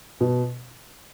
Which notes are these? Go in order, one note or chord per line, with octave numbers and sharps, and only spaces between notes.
B2